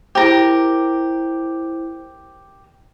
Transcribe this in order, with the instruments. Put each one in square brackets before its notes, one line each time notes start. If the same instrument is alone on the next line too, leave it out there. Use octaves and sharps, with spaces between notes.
[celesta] E4 C5 [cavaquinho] G4 A#4